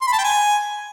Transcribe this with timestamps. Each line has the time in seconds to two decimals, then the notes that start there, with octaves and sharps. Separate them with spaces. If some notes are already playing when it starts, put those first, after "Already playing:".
0.01 C6
0.07 B5
0.13 A5
0.18 G5
0.24 G#5